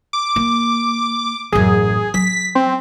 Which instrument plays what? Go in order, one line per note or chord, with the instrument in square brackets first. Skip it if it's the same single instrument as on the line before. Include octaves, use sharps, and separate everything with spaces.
[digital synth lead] D6
[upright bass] A#3
[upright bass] A1 F#2 [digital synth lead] G#4
[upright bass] F#3 [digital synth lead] B6
[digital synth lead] C4